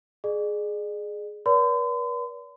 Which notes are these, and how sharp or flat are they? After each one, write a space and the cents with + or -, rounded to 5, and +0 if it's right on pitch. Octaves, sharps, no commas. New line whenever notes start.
G#4 +10 D5 +45
B4 -40 D5 -45 C6 -45